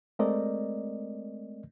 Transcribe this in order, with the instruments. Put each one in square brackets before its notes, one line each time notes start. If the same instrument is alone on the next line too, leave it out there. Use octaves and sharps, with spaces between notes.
[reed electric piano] G#3 A3 C4 A#4 D5 D#5